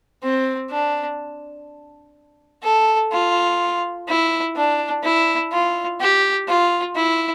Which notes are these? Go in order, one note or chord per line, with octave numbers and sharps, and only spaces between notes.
C4
D4
A4
F4
E4
D4
E4
F4
G4
F4
E4